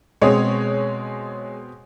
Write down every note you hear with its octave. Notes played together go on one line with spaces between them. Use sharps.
B2 G#3 C4 G#4 C#5